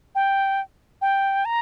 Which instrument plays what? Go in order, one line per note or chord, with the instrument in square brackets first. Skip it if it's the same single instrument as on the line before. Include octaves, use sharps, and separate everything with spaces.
[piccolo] G5
G5
A#5